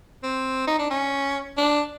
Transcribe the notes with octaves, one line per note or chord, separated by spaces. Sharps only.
C4
D#4
D4
C#4
D4